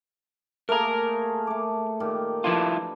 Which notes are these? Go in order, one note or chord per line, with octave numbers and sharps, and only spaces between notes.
A3 A#3 G#4 A#4 A#5
A3 D6
A#2 D#3 G4
F3 D4 E4 F4 B4